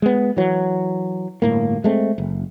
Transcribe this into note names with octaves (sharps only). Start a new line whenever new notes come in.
G#3 B3
E3 F#3
G1 A2 A#3
G#3 A3 C4
F#1